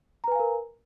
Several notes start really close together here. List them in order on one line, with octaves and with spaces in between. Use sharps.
A#5 B4 G#5 F5 A#4